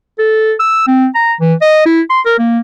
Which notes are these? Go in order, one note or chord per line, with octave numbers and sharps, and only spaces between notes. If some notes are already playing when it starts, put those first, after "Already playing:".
A4
E6
C4
A#5
E3
D#5
E4
C6
A#4
A#3